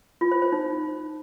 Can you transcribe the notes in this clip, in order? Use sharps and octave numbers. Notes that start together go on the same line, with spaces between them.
F4
C5
C5
D#4